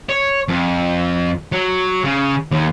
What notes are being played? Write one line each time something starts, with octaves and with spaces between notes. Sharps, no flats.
C#5
F2
F#3
C#3
D#2